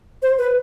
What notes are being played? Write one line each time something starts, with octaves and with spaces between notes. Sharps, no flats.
C5
B4